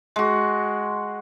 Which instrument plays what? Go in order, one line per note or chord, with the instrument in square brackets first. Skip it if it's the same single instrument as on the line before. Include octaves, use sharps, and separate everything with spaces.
[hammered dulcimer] G#3 F#4